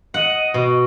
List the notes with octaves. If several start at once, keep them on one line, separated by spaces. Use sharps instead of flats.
D#5 F#5
B2